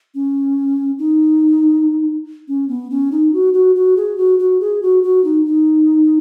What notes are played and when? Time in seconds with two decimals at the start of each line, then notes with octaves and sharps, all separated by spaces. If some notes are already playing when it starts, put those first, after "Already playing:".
0.15 C#4
0.99 D#4
2.48 C#4
2.69 B3
2.90 C#4
3.12 D#4
3.33 F#4
3.54 F#4
3.75 F#4
3.97 G#4
4.17 F#4
4.39 F#4
4.61 G#4
4.82 F#4
5.03 F#4
5.24 D#4
5.45 D#4